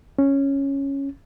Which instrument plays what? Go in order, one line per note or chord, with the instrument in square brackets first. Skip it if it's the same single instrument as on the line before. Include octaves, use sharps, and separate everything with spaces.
[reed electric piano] C#4